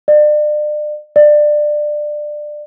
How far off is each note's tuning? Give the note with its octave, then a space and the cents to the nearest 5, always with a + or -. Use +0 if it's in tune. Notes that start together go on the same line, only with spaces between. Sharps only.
D5 +35
D5 +20